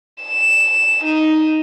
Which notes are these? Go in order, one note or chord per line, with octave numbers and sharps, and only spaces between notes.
E7
D#4